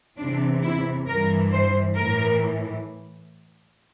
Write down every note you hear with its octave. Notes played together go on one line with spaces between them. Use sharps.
E2 C3 E3 D4
E4
G2 E3 A#4
C5
A2 E3 A#4